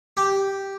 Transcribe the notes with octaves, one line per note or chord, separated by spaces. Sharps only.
G4